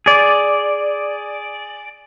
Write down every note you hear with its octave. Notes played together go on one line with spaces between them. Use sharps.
G#4 D5